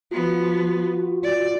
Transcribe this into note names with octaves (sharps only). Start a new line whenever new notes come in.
F3 B3 F4 F#4
D5